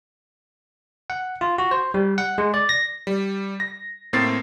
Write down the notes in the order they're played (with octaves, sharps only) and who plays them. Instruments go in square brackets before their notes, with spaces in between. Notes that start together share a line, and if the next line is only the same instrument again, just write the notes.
[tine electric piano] F#5
F4
F#4
C5
G3
F#5
G#3
D5
A#6
[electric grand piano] G3
A#6
A2 A#3 C4 A6 C7